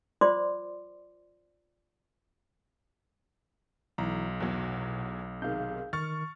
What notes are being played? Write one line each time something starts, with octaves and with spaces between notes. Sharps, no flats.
F4 C5 D5 C6 D6
B1 E3 E4 A#5
E2 B2 F#3
C3 D#3 G#4 F5 G6
D#3 C#6 F6 A6